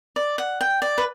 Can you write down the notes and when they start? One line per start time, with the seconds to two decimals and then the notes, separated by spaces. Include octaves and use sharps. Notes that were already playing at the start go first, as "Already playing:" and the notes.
0.16 D5
0.38 F#5
0.61 G5
0.82 D5
0.98 B4